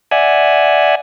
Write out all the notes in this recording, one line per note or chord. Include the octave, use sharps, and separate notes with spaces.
D5 E5 F#5 G#5